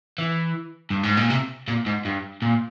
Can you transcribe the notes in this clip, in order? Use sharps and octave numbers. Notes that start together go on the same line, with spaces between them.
E3
G2
G#2
A#2
C3
A#2
G#2
G2
A#2